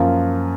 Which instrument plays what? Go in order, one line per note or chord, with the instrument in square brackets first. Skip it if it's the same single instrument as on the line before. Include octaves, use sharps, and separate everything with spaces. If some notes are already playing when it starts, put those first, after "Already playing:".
Already playing: [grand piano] F#2 F3 A#3 F4